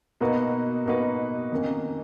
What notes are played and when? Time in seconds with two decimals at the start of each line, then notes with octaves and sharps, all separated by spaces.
0.21 B2 A#3 D#4 F#4 B4
0.86 B2 A#3 D#4 F#4 B4
1.52 F2 D#3 A#3 C#4